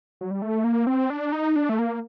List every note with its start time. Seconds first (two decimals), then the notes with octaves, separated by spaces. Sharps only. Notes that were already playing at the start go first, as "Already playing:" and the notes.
0.21 F#3
0.31 G3
0.42 A3
0.64 A#3
0.87 C4
1.10 D4
1.32 D#4
1.56 D4
1.69 A3
1.79 A#3